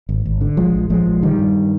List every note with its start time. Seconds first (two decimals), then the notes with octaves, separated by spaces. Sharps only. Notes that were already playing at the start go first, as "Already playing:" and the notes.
0.09 G#1
0.25 G#1
0.41 D3
0.57 A#1 F3 G#3
0.75 A#1
0.90 A#1 F3 G#3
1.06 A#1
1.22 D3 D#3 G3
1.39 G2